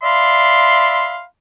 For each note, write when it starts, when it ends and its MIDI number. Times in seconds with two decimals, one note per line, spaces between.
0.03 1.23 74
0.03 1.23 76
0.03 1.23 77
0.03 1.23 83
0.03 1.23 84